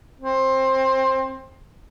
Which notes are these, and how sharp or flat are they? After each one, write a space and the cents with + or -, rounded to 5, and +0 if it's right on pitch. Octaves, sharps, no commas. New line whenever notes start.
C4 +20